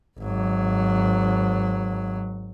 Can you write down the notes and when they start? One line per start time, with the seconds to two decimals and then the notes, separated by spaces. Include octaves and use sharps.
0.20 G#1 F#3